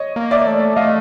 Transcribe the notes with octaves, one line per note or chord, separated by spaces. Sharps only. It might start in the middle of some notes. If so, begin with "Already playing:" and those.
Already playing: C#5 D#5
A#3
D5 E5
A3
A3 D#5 F5